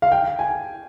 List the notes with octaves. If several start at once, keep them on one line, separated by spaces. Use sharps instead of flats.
F5
G5
G#5